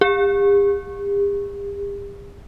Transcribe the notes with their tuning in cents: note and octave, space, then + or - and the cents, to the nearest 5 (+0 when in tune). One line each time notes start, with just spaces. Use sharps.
G4 +40